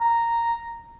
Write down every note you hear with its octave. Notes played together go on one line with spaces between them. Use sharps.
A#5